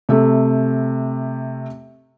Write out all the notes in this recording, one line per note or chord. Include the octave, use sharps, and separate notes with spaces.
C3 A3